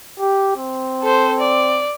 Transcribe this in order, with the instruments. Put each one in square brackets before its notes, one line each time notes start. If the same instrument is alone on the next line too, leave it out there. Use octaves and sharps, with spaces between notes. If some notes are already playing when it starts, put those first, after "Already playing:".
[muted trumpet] G4
C4
[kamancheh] A4 C5
D5